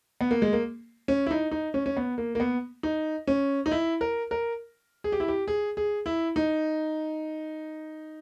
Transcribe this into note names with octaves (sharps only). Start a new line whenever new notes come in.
B3
A#3
G#3
A#3
C#4
E4
D#4
D#4
C#4
C#4
B3
A#3
A#3
B3
D#4
C#4
D#4
E4
A#4
A#4
G#4
G4
E4
G4
G#4
G#4
E4
D#4